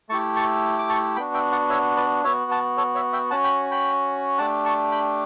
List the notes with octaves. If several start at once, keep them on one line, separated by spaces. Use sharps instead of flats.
A3 E4 G4 A5 C#6
A5 C#6
D6
A5 C#6
B3 D4 F#4 G5 B5
E5 G5
D5 F#5
C#5 E5
B4 D5
B3 F#4 C#5 E5
F#5 A5
A4 C#5
C#5 E5
E5 G5
C#4 F#4 F#5 A5
G5 B5
G5 B5
A3 D4 G4 F#5 A5
A5 C#6
G5 B5